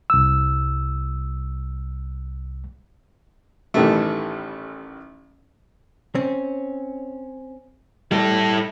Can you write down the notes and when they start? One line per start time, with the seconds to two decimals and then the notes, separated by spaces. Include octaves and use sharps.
0.10 C2 E6
3.74 A1 D#3 E3 G3 A3
6.15 C4 C#4
8.12 G3 E4 A4